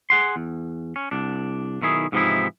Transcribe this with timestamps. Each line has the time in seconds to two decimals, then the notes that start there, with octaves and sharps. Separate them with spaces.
0.10 G#4 F#5 C6
0.36 E2
0.96 C#4
1.11 C2 D4
1.82 B1 D#3 E4 G#4
2.12 G#2 C3 E3 F3 D#4 E4